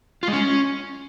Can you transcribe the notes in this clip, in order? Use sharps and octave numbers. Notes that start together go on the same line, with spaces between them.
F4
G#3
C#4